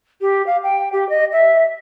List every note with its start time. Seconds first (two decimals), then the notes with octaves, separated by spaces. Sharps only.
0.21 G4
0.46 F5
0.63 G5
0.92 G4
1.09 D#5
1.32 E5